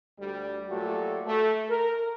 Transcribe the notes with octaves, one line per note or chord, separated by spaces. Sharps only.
D2 G3
A#2 F#3 A3 F#4 G4 A4
A3
A#4